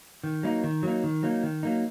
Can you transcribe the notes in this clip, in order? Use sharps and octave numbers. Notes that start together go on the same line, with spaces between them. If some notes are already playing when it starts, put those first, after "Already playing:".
D#3
F#3 A#3 D#4
D#3
F#3 A#3 D#4
D#3
F#3 A#3 D#4
D#3
F#3 A#3 D#4